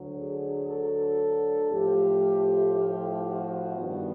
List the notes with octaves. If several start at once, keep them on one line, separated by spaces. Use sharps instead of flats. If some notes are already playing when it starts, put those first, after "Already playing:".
Already playing: D2 D3 F#3
G#4
A4
A2 F3 A3 G4
G4
F#4
G2 D#3 G3 B3